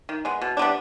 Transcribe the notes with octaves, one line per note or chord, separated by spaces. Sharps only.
D#3
G#3 B3
B2
G3 B3 D4